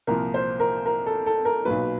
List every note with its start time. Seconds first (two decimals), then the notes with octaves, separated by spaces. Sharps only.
0.07 C2 A#2 F3 A#4
0.34 C5
0.60 A#4
0.86 A#4
1.06 A4
1.26 A4
1.45 A#4
1.65 B1 A#2 F#3 B4